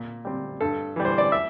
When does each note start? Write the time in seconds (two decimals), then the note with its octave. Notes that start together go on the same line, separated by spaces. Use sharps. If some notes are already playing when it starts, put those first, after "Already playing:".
Already playing: A#2
0.25 G3 C4
0.60 G2 A4
0.96 E3 G3
1.05 C5
1.18 D5
1.32 E5